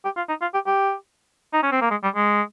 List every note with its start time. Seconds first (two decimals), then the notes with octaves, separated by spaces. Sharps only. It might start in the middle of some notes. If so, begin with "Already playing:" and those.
0.04 G4
0.17 F4
0.29 D#4
0.41 F4
0.54 G4
0.67 G4
1.53 D#4
1.63 C#4
1.72 C4
1.81 A#3
1.91 G#3
2.03 G3
2.16 G#3